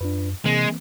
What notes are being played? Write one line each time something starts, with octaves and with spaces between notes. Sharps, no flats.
F#2 D4 F4 B4
C3 E3 G#3 A#3 C4